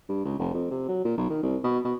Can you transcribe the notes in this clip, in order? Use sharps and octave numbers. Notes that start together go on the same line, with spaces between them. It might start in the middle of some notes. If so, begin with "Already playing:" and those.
G2
C#2
F1
F2
C3
F#3
A#2
B1
D#3
C2
B2
B2